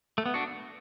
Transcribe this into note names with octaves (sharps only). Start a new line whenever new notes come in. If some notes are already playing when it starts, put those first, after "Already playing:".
A3
B3
D4 F#4